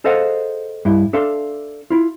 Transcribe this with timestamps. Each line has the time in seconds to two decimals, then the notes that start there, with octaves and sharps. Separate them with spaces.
0.04 G#4 A4 C5 D#5 F5 F#5
0.85 G2 E4
1.13 D4 A4 E5 F5 C6
1.90 E4 F4